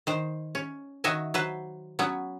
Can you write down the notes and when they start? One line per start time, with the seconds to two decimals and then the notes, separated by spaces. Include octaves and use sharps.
0.07 D#3 C5
0.55 C#4
1.04 D#3 F#4 D#5 E5 G#5
1.34 F#3 B4 C5
1.99 F#3 B3 C#4